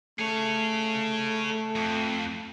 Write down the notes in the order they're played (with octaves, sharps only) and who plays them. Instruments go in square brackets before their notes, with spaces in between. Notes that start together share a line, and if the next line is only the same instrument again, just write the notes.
[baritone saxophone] A3 [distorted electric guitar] G#4 C#5
[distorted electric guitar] F2